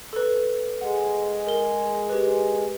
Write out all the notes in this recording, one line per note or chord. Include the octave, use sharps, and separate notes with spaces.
A4 B4
G#3 F#5
A#4 G7
G4 B4